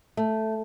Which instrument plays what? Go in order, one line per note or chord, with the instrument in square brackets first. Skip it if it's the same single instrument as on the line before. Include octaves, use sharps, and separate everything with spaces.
[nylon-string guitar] A3